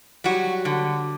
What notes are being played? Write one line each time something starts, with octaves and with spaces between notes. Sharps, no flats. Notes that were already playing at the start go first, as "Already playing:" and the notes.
F#3 G3 F#4
D3